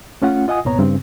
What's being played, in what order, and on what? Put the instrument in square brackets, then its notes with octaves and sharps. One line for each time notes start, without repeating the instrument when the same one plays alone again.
[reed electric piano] A3 C#4 F4 F#5
F4 D#5 F#5 G#5 D#6
C2 G2 A#2 B3 C#5 A#5
G2 C#3 C4